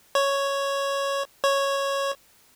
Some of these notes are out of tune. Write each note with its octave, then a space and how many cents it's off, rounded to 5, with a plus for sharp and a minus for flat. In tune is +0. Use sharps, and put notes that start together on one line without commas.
C#5 +0
C#5 -5